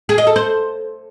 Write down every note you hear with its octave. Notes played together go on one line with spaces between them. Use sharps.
G#4
D#5
A4
C5